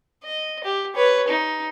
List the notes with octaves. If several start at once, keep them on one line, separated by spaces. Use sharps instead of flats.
D#5
G4
B4 C#5
D#4